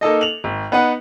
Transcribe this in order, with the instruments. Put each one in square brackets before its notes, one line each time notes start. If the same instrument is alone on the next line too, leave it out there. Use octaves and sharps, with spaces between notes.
[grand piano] A#3 D#4 A4 D#5
F7 F#7
G#1
B3 D#4 B4 F#5